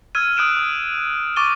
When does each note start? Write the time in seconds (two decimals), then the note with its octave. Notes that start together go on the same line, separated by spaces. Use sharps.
0.15 E6 F6 G#6 D#7
0.37 D#6 F#6 D7 E7
0.57 D#6
1.36 C#6 D6 A6 D#7 G7